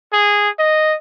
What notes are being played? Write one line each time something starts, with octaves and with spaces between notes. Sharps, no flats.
G#4
D#5